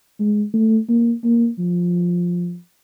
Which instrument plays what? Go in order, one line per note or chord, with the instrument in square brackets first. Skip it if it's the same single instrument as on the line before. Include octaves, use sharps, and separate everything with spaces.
[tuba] G#3
A3
A#3
A#3
F3